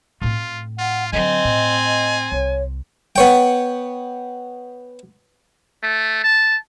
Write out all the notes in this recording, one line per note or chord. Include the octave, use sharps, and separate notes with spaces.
A2 C4 F4
F4 F#5
D3 F#3 C4 D#5 G#5
A2
D#5
C2 C#5
B3 C#5 G5
A3
A5